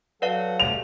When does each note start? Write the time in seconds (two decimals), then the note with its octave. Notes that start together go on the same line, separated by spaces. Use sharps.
0.22 F#3 A4 B4 D5 F5 F#5
0.60 G3 A3 G4 F7